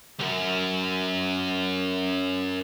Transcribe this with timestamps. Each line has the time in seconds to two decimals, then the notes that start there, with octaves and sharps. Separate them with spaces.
0.19 C#2 F#2